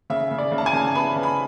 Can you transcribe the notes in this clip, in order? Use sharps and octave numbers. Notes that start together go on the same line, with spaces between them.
C#3 E5
C#3
D5
C#3
A5
G#5
C#3
A5
B3 B5
C#3
B5